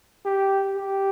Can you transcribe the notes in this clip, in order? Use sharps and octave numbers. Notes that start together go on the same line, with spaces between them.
G4
G4